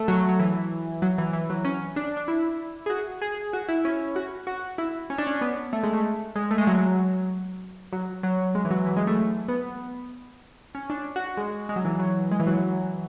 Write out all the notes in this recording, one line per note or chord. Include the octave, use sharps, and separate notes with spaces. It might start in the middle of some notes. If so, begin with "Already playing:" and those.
Already playing: A3
F#3
F#3
E3
F#3
E3
E3
F#3
C#4
D4
D4
E4
G#4
F#4
G#4
F#4
E4
C#4
F#4
F#4
E4
C#4
D4
C#4
B3
A3
G#3
A3
G#3
A3
G#3
F#3
F#3
F#3
G#3
E3
F#3
E3
G#3
A3
B3
C#4
D4
F#4
F#4
G#3
G#3
F#3
E3
F#3
G#3
E3
F#3